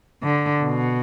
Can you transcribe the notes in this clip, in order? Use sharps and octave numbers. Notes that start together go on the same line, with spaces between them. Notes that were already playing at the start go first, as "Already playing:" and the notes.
D3
B2